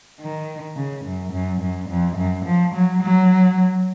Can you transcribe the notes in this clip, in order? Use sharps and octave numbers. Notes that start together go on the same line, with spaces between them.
D#3
C#3
F#2
F#2
F#2
F2
F#2
F3
F#3
F#3